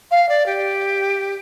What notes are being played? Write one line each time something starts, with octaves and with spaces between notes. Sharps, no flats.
F5
D5
G4